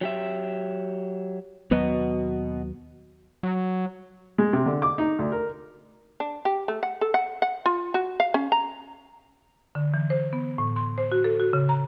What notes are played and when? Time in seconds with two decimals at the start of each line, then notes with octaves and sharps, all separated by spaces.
0.01 F#3 G4 E5
1.71 D#2 B2 F#3 B3 F#4 D#5
3.43 F#3
4.38 G#3
4.53 C3
4.66 D3
4.82 D6
4.98 D#4
5.19 D2
5.32 A#4
6.20 D4
6.45 G4
6.68 A3
6.83 F#5
7.01 A4
7.14 F#5
7.42 F#5
7.66 F4
7.94 F#4
8.20 F5
8.34 C#4
8.52 A#5
9.75 D3
9.94 E3
10.10 C5
10.33 B3
10.58 A2
10.76 C6
10.98 C5
11.12 F#4
11.24 A4
11.40 F#4
11.53 C#3
11.69 A#5